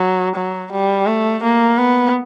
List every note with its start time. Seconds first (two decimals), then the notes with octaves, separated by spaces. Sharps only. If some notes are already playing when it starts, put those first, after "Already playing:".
Already playing: F#3
0.35 F#3
0.72 G3
1.07 A3
1.43 A#3
1.78 B3